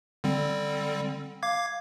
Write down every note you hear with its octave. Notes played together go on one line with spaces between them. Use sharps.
D3 G3 C4
F5 D6 G#6